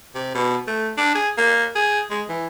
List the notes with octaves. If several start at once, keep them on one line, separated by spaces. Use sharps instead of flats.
C3
B2
A3
D4
G#4
A#3
G#4
G#3
E3